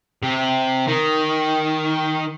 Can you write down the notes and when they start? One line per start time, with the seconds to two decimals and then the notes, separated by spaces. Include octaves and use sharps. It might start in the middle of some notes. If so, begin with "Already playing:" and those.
0.23 C3
0.87 D#3